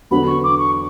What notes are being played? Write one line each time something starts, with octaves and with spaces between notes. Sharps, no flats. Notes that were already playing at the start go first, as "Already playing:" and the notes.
E2 D3 F#3 B3 F#4 B5
C#6
D6
C#6